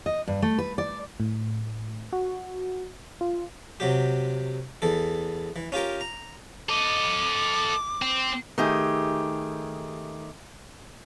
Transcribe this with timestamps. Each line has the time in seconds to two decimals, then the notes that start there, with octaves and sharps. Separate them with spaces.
0.06 D#5
0.28 G2
0.42 A3
0.58 B4
0.78 D5
1.20 A2
2.13 F#4
3.21 F4
3.80 C3 F#3 G4
4.82 E2 E3 A4
5.56 E3
5.72 C#4 F4 G4 A#4
6.01 A#5
6.69 A4 D#5 D6
8.02 C4
8.58 D#3 A3 G4 G#4